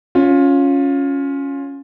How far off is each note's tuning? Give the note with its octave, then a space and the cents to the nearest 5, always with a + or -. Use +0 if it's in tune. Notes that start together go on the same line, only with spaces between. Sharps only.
C#4 +0 F4 +15